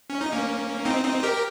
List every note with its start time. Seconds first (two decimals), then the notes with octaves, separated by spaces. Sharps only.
0.10 C#4
0.21 D#4
0.32 A#3 C#4
0.85 C4 D#4
1.04 C4 D#4
1.23 G4 A#4